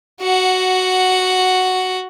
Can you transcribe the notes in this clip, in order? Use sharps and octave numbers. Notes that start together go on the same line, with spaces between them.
F#4 F#5